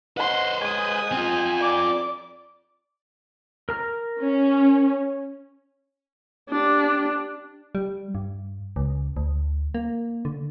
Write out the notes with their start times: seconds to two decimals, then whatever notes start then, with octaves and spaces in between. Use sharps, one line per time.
0.17 B4 C5 D#5 F#5 C6
0.61 G#3 G#5 D#6
1.12 C4 F4
1.59 D5 D6
3.69 A#4 A#5 F6
4.20 C#4
6.50 D4 G4
7.75 G3
8.15 G2
8.76 C#2
9.17 D2
9.75 A#3
10.25 D3